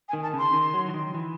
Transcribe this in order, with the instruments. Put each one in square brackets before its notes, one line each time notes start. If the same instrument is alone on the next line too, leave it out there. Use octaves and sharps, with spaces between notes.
[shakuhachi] G#5
[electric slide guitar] D#3
[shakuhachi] A5
[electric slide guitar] C#3 [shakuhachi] C6
[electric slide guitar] D#3
F#3
E3
D#3
E3